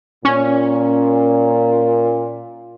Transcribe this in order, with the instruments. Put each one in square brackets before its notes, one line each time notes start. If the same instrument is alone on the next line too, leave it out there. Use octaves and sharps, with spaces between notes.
[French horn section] A#2 [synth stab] C#4